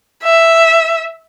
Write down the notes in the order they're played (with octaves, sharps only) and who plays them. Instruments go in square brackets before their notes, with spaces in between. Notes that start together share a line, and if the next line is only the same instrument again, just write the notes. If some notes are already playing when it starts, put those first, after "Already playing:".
[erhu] E5